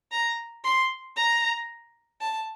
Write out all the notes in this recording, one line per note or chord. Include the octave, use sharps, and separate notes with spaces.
A#5
C6
A#5
A5